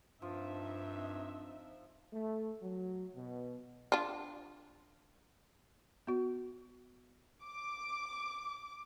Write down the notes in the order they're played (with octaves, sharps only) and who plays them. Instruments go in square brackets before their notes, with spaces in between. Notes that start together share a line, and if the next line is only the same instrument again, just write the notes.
[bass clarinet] G2 [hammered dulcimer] F3 [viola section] C4 D#4 E5
[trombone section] A3
F#3
B2
[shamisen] D4 F4
[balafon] B3 F#4
[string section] D6